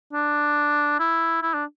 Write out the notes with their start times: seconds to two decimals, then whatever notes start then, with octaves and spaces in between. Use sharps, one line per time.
0.13 D4
0.99 E4
1.42 E4
1.54 D4